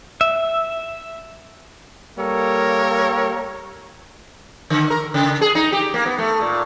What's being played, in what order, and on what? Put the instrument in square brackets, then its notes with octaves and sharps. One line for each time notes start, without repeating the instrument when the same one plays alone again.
[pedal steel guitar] E5
[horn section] G3 A#3 A4 A#4 C#5
[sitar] D3
A#4
C#3
G#4
D#4
G4
A#3
B3
A3
A#2